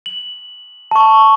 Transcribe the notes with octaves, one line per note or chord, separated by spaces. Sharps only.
F#7
A5 C#6